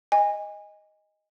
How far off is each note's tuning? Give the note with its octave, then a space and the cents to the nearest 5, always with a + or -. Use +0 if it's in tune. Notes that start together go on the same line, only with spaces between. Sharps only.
D#5 +0 G#5 -25